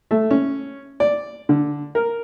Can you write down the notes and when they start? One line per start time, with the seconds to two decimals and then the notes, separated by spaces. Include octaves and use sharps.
0.11 A3
0.31 C#4
1.00 D5
1.49 D3
1.95 A#4